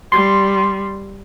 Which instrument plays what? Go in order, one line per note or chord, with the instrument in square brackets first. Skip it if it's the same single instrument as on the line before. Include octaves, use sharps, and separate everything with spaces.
[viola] G3 [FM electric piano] C6